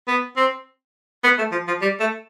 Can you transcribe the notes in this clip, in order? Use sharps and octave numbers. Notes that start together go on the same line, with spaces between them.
B3
C4
B3
A3
F3
F3
G3
A3